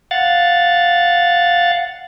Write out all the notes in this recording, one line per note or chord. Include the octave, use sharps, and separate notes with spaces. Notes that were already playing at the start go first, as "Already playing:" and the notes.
F5 F#5 A6